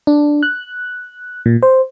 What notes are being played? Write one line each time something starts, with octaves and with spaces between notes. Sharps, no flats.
D4
F#6
A#2
C5